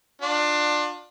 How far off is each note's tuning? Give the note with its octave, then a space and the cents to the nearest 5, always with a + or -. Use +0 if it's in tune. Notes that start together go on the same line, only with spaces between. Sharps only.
D4 +20 F4 +30